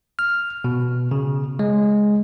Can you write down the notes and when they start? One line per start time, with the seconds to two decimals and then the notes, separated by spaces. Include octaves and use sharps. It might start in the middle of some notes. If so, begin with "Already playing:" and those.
0.19 F6
0.64 B2
1.11 C#3
1.59 G#3